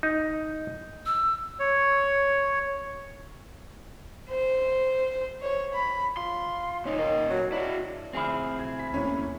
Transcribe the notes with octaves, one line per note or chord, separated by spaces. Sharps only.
D#4
E6
C#5
C5
C#5
B5
F4 C6
A#2 C#4 D#4
A#2 D#3 D#5
F#3
D4 E4 F#4
D2 F3 C4 E4 G#4
B1 G#6
B6
D#2 A2 A#3 C#4